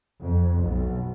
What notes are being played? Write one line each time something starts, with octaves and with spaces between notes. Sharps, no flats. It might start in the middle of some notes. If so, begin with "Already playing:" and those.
F2
B1